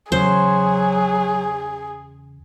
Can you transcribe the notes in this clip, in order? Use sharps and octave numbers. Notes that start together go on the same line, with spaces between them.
E2 C#3 F#3 G#4 C5